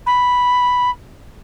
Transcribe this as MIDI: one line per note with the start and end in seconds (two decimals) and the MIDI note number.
0.06 0.90 83